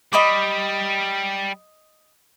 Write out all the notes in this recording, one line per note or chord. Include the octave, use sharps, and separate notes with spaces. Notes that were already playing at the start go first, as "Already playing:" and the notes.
G3 D#5 B5 D6